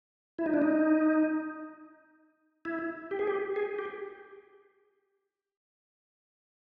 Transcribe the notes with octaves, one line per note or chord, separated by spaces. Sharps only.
E4
D#4
D4
D#4
E4
G4
G#4
G4
G#4
G4